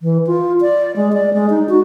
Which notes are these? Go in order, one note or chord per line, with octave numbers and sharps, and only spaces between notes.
E3
F4
D5
G#3
D5
G#3
D#4
F#4